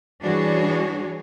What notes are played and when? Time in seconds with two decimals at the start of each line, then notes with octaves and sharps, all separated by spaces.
0.22 E3 G3 D4 F#4 G#4 C#5